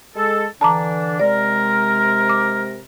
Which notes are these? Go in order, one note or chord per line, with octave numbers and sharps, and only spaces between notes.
G#3 A4
D3 E3 D4 A5 A#5 D6
C3 G#3 A#4 D5
D6